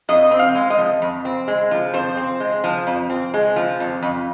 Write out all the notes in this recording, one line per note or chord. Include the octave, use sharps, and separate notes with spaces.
F2 D#5
C4
F5
G#3
D#5
F3
F2
C4
G#3
F3
F2 C5
C4
G#3
F3
F2
C4
G#3
F3
F2
F2